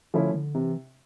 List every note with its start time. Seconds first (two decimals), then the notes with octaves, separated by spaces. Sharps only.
0.14 D3 F3 A3 C#4 E4
0.34 D3
0.55 C3 E3